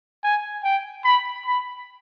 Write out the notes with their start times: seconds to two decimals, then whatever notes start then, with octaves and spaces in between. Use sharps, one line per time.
0.23 G#5
0.64 G5
1.05 B5
1.46 B5